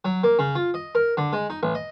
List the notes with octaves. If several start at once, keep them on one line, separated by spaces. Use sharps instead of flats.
F#3
A#3
C#3
F4
D#5
A#4
D3
G#3
D#4
A1
D#5